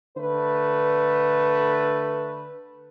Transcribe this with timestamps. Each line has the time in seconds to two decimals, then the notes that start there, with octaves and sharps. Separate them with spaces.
0.17 D3 A3 B4